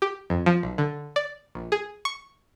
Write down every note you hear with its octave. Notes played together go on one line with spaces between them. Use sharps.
G4
F2
F3
B1
D3
D5
A#1
G#4
C#6